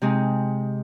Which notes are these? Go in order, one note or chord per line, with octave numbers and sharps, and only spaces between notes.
C3 G#3 C4 D#4